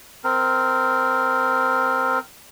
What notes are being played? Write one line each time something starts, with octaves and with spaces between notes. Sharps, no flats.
C4 A#4